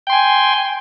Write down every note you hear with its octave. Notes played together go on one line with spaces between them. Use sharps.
G5 G#5 C6